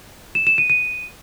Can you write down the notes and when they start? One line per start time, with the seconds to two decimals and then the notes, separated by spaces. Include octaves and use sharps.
0.35 E7
0.47 E7
0.58 D#7
0.70 D#7